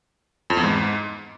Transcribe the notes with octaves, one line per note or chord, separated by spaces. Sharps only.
F2
E2
G#2